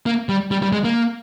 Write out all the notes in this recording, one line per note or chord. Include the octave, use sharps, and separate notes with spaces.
A#3
G3
G3
G3
G#3
A#3